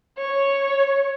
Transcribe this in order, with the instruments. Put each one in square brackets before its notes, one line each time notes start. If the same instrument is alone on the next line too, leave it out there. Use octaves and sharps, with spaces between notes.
[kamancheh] C#5